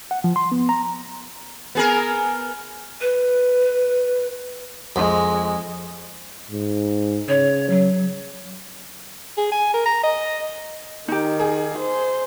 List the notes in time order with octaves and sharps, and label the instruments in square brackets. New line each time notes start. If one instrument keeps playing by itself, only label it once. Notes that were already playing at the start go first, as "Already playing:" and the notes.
[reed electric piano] F#5
F3
C6
B3
A#5
[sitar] B3 G#4 A#4
[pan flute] B4
[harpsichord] F2 [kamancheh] G#3
[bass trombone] G#2
[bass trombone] C#3 [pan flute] C#5
[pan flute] F#3
[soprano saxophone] G#4
G#5
A#4
A#5
D#5
[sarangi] D#3 [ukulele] D#4 G4
[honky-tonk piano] G#4
[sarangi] C5